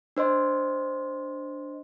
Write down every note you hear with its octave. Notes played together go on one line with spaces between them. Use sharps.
D4 C5 D#5 C6